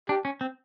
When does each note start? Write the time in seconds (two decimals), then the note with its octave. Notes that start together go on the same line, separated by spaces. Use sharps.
0.09 D4 G4
0.25 C#4
0.41 C4